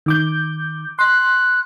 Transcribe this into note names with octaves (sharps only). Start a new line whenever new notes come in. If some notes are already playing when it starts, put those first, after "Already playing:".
D#3 D6 G6
C6 F#6